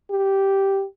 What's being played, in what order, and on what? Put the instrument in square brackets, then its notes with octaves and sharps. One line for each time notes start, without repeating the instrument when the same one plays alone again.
[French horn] G4